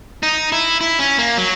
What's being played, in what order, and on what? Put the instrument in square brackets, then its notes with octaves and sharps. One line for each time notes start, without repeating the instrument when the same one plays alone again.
[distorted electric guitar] D#4
E4
E4
C#4
A#3
F#3